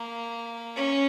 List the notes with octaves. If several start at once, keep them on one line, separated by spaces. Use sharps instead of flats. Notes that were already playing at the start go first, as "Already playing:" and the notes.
Already playing: A#3
C#4